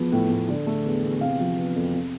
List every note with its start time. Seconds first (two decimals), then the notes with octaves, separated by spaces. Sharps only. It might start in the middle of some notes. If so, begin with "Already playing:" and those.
Already playing: E2 F3 B3
0.12 A2
0.30 A2
0.49 D3
0.66 A3
0.85 E2
1.03 E2
1.21 C3 F5
1.39 F3
1.57 B3
1.76 F2
1.93 C3